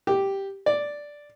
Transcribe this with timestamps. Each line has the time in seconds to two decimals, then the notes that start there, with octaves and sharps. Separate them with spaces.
0.07 G4
0.66 D5